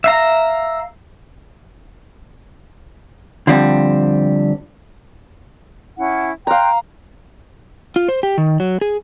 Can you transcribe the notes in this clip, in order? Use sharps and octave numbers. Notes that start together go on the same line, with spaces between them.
E5 F5 A#5
D3 F3 G3 C4
C#4 E4 F#5
F5 G5 A#5 C6 F#6
F4
C5
G4
D#3
F#3
G#4